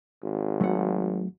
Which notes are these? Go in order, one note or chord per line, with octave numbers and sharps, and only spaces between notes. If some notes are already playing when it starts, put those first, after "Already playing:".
G#1
F#3 A3 F#5